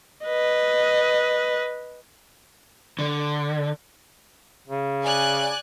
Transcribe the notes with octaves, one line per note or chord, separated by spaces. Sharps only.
B4 D#5
D3
C#3
D5 G#5 F#6